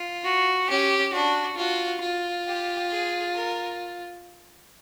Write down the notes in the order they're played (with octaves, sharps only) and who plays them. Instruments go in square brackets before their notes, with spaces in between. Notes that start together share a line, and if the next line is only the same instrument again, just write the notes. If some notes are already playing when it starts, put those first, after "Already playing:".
Already playing: [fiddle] F4
[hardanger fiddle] F#4
[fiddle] C#4 [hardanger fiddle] G4
[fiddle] D4 [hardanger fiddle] F#4
[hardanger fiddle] F4 [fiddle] F#4
[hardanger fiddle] F4
[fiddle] G4
G#4
A#4